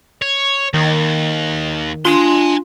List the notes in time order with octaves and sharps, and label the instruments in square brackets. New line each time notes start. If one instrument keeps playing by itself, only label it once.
[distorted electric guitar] C#5
[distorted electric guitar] D#2 [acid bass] D#3
[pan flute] D4 [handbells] F4 [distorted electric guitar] G#5 C6